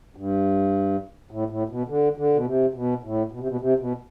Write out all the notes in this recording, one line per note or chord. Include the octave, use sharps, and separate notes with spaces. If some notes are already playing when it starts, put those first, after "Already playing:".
G2
A2
A2
B2
D3
D3
B2
C3
B2
A2
B2
C3
B2
C3
B2